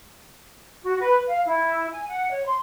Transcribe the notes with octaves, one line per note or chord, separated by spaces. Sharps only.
F#4
B4
F5
E4
G#5
F#5
C#5
C6